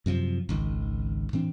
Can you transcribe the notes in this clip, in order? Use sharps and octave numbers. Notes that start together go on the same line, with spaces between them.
F#2 C3 E3 F3
G#1 C#2 D#3
A2 E3 C4 D4